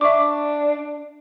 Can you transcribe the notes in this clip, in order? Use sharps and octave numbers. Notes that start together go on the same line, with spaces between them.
D4 E5 C#6 D6